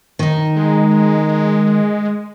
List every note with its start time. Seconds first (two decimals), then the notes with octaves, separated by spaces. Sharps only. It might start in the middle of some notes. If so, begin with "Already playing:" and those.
0.19 D#3 D#4
0.56 G#3